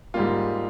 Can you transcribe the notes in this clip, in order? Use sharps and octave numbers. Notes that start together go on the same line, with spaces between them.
G#2 G3 A#3 F4